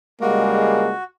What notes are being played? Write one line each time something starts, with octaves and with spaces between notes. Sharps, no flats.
C#2 G3 G#3 A#3 F#4